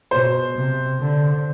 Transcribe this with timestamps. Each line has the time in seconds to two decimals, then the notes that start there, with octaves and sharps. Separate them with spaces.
0.11 B2 C5
0.56 C3
1.00 D3